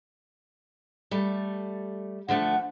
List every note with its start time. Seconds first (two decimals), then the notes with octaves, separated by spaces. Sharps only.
1.11 G3 A3
2.28 D3 F3 A3 F#5